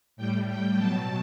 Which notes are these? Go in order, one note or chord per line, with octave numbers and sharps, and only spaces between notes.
A2 G3 G5
G5
B2 F#3 A5